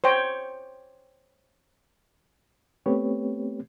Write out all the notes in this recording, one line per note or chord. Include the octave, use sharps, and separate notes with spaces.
C5 C#5 G5
A3 B3 C4 G4 B4 C#5